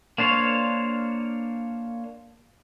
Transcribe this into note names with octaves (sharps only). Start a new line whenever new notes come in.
A#3 D4 C5 C#5 F5